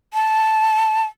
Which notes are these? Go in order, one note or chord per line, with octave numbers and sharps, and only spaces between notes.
A5